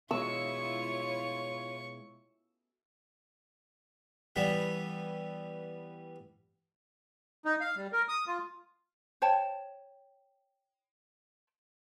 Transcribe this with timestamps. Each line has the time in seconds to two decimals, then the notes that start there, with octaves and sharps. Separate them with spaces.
0.11 B2 G#3 E4 F4 C#5 C#6 E6
4.36 E3 G3 B3 E5
7.45 D#4
7.61 F5
7.76 G3
7.93 A#4
8.09 D#6
8.27 F4
9.22 C5 C#5 G5 A5